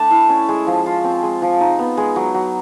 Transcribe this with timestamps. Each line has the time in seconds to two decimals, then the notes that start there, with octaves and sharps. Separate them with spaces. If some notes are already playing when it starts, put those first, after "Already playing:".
Already playing: A3 D4 A5 B5
0.11 E4
0.29 C#4
0.49 G#3
0.67 F3
0.86 F4
1.04 C4
1.23 G#3
1.42 F3
1.60 D#4
1.79 B3
1.97 G#3
2.16 F#3
2.34 F#3